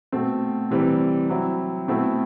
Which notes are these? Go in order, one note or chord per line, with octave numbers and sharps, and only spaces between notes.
B2 A3 C4
C3 E3 G3 C4
F#3 C4 E4
B2 A3 C4 E4